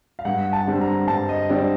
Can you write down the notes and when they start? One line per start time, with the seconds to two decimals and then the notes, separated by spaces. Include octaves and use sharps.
0.19 F5
0.25 G2 F#5
0.53 A5
0.67 D3 G3 C4
0.81 A#5
1.08 G2 A5
1.29 D#5
1.49 D3 G3 C4 D5